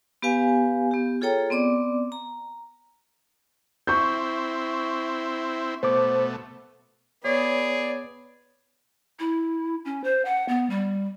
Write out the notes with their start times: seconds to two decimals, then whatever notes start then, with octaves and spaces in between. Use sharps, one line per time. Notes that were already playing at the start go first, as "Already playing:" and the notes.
0.22 B3 G4 B4 F5 G#5
0.91 B3 G4
1.21 F4 G#4 A4 C#5 G5 A#5
1.50 B3 C4 D5 D6
2.12 A#5
3.87 C4 E4 C#6 G6
5.83 B2 A3 C5 D6
7.25 B3 G#4 C#5 D5
9.19 E4
9.85 C#4
10.04 C5
10.25 F#5
10.49 B3
10.70 G3